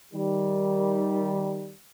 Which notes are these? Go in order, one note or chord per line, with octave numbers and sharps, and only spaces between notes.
D#3 G3